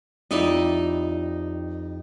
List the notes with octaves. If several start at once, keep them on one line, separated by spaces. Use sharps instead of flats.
F2 D#4 E4 G4 D5